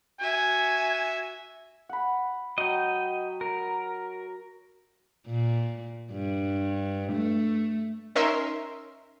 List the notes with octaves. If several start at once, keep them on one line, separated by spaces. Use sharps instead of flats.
F#4 E5 G#5
F#5 B5
F#3 D#5 G5
A#4
A#2
G2
A3
C#4 D#4 A#4 E5 C6